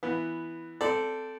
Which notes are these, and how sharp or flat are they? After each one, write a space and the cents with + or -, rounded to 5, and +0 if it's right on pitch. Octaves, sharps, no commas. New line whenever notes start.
E3 +0 B3 +0
C4 -15 A4 +0 D5 +0